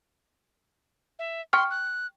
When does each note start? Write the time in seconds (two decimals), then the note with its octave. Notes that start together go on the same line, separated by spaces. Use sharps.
1.19 E5
1.53 G5 C6 C#6 F6
1.70 F#6